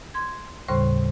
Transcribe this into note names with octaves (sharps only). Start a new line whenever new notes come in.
C6 G#6
D#2 A2 C#3 G3 C5 C6